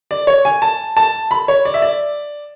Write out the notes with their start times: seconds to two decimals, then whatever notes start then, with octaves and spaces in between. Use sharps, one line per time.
0.11 D5
0.27 C#5
0.45 G#5
0.62 A5
0.97 A5
1.31 B5
1.48 C#5
1.65 D5
1.74 E5
1.82 D5